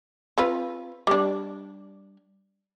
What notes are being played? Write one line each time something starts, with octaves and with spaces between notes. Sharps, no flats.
C4 F4 B4
G3 D4